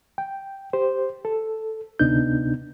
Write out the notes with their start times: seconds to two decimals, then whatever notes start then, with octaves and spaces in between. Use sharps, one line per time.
0.18 G5
0.73 G4 C5
1.25 A4
1.99 D2 C3 B3 D4 D#4 G6